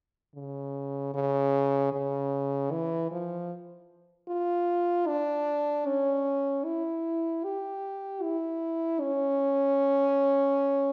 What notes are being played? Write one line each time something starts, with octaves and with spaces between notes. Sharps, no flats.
C#3
C#3
C#3
E3
F3
F4
D4
C#4
E4
G4
E4
C#4